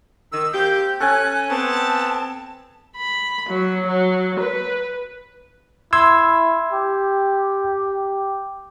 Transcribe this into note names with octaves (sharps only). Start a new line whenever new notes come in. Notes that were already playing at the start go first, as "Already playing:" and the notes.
D#3 E6
A#3 C4 G4 G6
C#4 A4 G#5 F#6
B3 C4 A5
B5
F#3
F#3
B4
E4 C6 E6 G#6
G4